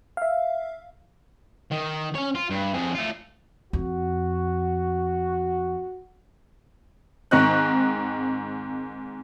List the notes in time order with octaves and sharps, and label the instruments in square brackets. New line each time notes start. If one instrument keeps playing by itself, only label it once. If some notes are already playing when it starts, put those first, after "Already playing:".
[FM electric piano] E5 F5
[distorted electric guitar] D#3
C#4 C#5
F4
G2
F2 G#4
A3 F4
[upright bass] F2 [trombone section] F#4
[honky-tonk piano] G#2 D#3 C4 D#5 C#6 F#6